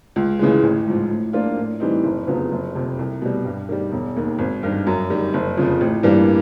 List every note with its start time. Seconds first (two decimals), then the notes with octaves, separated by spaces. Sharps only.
0.16 C#2
0.39 C#3 E3 G#3
0.63 A1
0.87 G#2 F3
1.11 A2
1.33 F3 A#3 D4 F4
1.57 A2
1.80 E3 G3 C4 D#4
2.04 F#1
2.27 F2 C#3 F#3 B3
2.52 F#1
2.75 F2 C3
2.99 C2
3.22 B2 G3
3.45 G2
3.69 D#3 G3
3.92 E1
4.16 D#2 D#3
4.39 G#1
4.63 G2 D#3
4.87 F#2
5.10 D#3 G3
5.34 F#1
5.57 F2 C#3 F3
5.81 A1
6.03 G2 E3 G3 A#3